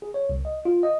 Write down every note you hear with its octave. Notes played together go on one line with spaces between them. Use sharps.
G#4
C#5
C2
D#5
F4
D#5